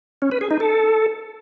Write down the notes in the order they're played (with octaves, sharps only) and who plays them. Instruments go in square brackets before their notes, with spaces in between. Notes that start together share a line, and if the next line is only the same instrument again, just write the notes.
[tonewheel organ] C#4
B4
G#4
D#4
A4